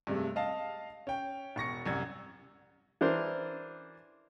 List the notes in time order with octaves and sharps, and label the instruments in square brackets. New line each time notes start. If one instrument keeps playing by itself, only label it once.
[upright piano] G2 C3 G#3 A3
D#5 F5 A5
C#4 G5
E1 C#6 A#6 C#7
C2 F#2 G#6
[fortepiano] E3 D4 A#4 C5